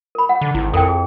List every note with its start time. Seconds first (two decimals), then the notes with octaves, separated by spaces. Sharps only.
0.15 A#4 B5
0.29 F#5
0.41 D3
0.54 G#1 E4
0.73 F2 A4 A#4 G5
0.89 G#4